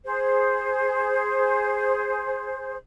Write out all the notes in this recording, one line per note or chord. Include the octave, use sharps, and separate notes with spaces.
G#4 C5